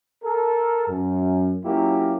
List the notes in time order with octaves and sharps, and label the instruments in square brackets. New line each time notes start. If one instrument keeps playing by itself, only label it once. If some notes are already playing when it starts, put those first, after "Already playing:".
[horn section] A4 A#4
F#2
F#3 A#3 C#4 E4 F4 G4